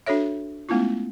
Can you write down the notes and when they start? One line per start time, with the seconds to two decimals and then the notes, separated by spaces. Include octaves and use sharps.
0.06 D4 F#4 A4 C#5 E5
0.69 G#3 A3 B3 C#4 E4 F4